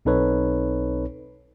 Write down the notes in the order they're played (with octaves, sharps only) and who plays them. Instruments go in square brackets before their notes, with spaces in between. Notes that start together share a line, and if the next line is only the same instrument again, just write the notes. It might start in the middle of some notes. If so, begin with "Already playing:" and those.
[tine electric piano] B1 C4 D#4 A4 B4 C#5